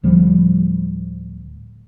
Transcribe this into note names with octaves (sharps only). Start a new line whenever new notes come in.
D1 D2 F3 G3